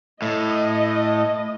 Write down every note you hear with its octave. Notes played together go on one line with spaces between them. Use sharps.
A2 D#5